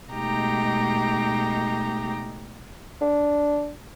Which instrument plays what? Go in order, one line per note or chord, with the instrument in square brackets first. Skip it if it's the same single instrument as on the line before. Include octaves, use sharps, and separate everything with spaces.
[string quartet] B2 G#3 A3 D#4 G4 A#5
[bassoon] D4